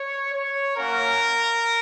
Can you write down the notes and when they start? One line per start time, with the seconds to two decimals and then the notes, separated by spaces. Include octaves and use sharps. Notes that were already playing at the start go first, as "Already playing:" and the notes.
Already playing: C#5
0.32 C#5
0.76 A#3 C#4 F#4 A#4